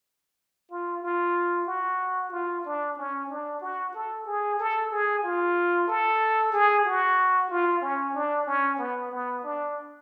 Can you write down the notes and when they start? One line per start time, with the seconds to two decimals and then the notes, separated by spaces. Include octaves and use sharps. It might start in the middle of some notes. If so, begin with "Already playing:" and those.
0.71 F4
1.02 F4
1.67 F#4
2.31 F4
2.65 D4
2.97 C#4
3.30 D4
3.61 F#4
3.94 A4
4.26 G#4
4.59 A4
4.91 G#4
5.23 F4
5.87 A4
6.52 G#4
6.85 F#4
7.50 F4
7.81 C#4
8.15 D4
8.46 C#4
8.78 B3
9.11 B3
9.43 D4